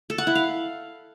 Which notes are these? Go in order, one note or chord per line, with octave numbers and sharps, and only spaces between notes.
A4
F#5
E4
F5